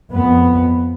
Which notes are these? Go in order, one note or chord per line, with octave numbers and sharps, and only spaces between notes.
F2 B3